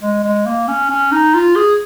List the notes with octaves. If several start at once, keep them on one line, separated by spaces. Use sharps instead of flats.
G#3
G#3
A#3
C#4
C#4
D#4
F4
G#4